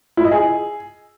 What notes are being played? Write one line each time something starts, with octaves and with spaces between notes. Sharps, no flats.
E4
D#5
G#4